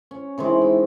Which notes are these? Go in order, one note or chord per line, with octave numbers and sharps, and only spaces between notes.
C#4
C3 D#3 E3 G#3
G5